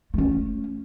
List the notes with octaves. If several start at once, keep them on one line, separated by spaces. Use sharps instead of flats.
A3 C#4